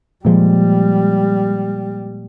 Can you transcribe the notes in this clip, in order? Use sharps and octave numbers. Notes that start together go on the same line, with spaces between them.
A#2 F3 G3 G#3